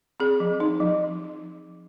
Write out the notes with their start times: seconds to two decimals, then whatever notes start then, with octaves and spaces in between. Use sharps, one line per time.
0.20 C4 G#4
0.40 F3
0.60 D#4
0.80 F3